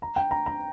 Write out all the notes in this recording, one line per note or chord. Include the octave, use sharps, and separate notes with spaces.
A#5
G5
A#5
A#5